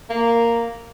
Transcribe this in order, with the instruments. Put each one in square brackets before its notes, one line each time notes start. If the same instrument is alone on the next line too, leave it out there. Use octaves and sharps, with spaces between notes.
[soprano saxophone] A#3